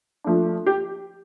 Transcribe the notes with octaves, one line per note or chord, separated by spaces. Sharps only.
F3 A3 D4
G4